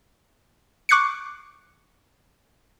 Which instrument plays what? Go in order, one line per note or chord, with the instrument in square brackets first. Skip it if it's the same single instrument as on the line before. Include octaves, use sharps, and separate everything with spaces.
[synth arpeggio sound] C#6 D6 F#6 G#6 C7 C#7